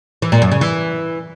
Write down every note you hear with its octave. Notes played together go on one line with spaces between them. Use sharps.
E3
A#2
F#2
C#3
E3